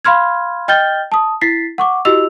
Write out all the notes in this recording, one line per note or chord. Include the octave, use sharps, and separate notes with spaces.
F5 B5 C6 F6 G#6
D#5 G5 F6 G6 A6 G7
A5 D#6
E4 A6 B6 C7
F#5 C#6 D6
E4 F#4 G4 D#5 E6 F7